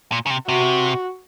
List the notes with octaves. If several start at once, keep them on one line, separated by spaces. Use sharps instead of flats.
A#2
C#3
C3
C3 F#4